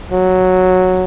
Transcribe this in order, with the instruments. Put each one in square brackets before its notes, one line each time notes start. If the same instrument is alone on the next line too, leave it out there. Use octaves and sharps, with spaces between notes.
[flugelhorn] F#3